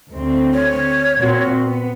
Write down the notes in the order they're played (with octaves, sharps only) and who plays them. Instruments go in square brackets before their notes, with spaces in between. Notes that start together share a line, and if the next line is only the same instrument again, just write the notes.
[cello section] D2 C4
[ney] C#5
[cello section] A#2 C4 F#4
B3